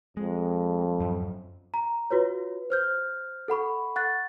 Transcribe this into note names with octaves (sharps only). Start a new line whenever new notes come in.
F2 G#3
D1 F#2
A#5
F4 F#4 B4 C#5
C5 F6 G6
A4 F#5 B5 C#6
F#5 C#6 F#6 A6